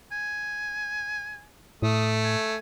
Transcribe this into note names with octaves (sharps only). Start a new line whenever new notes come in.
G#5
A2 A3 D#6
G#5